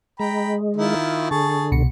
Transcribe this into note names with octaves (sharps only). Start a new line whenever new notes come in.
G#3 G5 A#5 B5
D#3 E4 F4
D3 G#4 A5 C#6
C2 B2 C#7